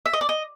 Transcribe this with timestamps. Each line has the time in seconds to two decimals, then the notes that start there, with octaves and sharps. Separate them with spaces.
0.06 E5
0.13 D#5
0.21 D5
0.29 D#5